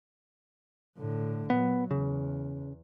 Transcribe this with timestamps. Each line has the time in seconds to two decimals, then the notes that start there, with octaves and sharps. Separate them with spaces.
0.98 A2 D3
1.50 A#2 F#3 B3
1.91 E2 C#3